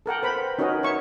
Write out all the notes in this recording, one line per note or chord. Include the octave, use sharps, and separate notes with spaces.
A4 A#4 F#5 G5
B4 C5 B5
C#4 D#4 F#4 A#4 B4 D#5
C#5 E5 C#6